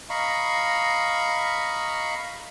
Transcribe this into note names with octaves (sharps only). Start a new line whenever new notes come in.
D#5 F5 A#5 B5 C#6